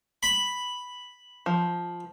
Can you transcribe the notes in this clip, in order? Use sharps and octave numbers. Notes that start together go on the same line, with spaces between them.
B5
F3